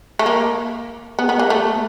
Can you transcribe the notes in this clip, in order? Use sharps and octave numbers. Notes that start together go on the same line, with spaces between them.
A3
A#3
B3
B3
A#3
A3